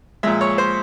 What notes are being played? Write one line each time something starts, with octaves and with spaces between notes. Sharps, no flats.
A#2 F3 G#3 E5
C#5
C5